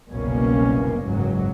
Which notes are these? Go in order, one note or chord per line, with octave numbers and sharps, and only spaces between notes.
F#1 C2 B2 A#3 C#4
F#1 C#2 G#2 F#3